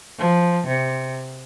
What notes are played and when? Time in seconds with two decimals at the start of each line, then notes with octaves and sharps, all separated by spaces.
0.19 F3
0.67 C3